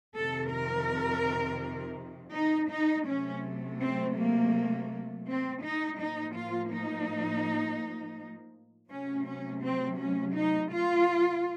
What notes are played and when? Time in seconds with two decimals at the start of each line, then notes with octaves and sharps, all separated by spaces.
0.15 F2 C3 D#3 A4
0.51 A#4
2.33 D#4
2.71 D#4
3.06 C3 F#3 A3 C#4
3.79 C4
4.16 A#3
5.26 C4
5.62 D#4
5.98 A2 F3 A#3 D#4
6.34 F4
6.71 D#4
8.89 C3 F#3 A3 C#4
9.26 C#4
9.63 C4
9.99 C#4
10.35 D#4
10.72 F4